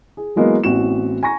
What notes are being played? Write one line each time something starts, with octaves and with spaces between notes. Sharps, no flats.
G#4
E3 F#3 G#3 A#3 B3 G#4
A1 E3 B3 C4 F#4 E7
G#5 A#5 C#6 A#6